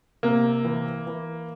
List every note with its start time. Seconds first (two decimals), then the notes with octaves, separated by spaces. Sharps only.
0.23 C3 A#3
0.65 E3
1.07 E3